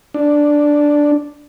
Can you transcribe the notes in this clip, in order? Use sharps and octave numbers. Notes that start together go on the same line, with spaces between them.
D4